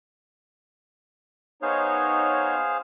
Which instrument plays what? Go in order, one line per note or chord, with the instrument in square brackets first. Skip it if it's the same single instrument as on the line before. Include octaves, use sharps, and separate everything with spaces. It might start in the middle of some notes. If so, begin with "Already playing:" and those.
[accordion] B3 D#4 C#5 [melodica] G#4 C5 F5